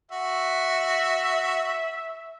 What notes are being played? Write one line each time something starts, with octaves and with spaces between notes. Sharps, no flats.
F#4 E5